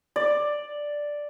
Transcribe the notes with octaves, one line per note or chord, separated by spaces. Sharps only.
D5